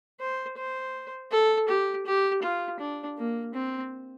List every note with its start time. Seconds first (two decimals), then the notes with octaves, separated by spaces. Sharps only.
0.20 C5
0.58 C5
1.31 A4
1.68 G4
2.06 G4
2.42 F4
2.79 D4
3.17 A#3
3.54 C4